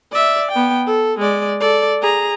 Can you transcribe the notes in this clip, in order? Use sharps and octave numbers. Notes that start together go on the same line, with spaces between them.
D5 E5
B3 G5
A4
G#3 D5
A4 D5
G#4 A#5